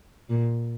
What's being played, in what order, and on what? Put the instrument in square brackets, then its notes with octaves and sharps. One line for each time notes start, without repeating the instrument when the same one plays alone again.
[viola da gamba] A#2